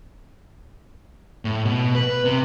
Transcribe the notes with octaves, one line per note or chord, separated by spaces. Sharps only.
A2
B2
B4
C3